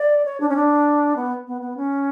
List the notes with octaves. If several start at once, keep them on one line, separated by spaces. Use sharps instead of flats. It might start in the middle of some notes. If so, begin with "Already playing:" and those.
Already playing: D5
C#5
D4
C#4
D4
B3
B3
B3
C#4